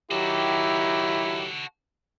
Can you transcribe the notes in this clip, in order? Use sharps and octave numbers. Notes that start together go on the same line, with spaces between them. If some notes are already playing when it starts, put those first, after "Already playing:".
D#3 F#3 E4 F#4 G4 A4